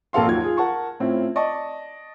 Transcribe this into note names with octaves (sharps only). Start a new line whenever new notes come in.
A#1 A#3 A4 F5 C6
D#2 F3 F#3 G#6
F4 G#4
A#4 F#5 A5 C#6
A2 C4 C#4 E4 F4
D5 D#5 A5 C#6